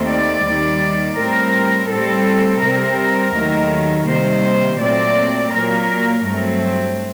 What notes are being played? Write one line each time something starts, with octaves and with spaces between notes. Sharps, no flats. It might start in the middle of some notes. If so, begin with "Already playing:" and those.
Already playing: D#2 D#3 A3 C4
D5
D#2 D#3 G3
A2 G3 C4 A#4
A2 G3 C4 A4
C3 G3 C4 A#4
D#2 D#3 F#3 A3
C3 D#3 G3 A#3 C5
A#2 F#3 A3 C4 D5
A#2 F#3 A#3 A#4
G2 F#3 A3 C4